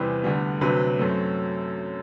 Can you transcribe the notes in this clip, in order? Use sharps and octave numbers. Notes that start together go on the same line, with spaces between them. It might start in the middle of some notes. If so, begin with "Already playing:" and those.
Already playing: E2 C3 E3 G3 C4 B4
D2 D3 G3 B3
D2 C3 F#3 C4 B4
F#2 F#3 A3 C4